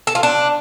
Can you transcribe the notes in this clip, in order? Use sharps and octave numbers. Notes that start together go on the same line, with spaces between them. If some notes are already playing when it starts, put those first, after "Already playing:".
A4
F4
D4